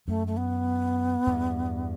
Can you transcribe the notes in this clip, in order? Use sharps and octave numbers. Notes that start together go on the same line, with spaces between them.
F#2 A3
A3
B3
E2 G2